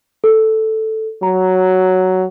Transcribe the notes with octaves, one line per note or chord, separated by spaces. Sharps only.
A4
F#3 A#5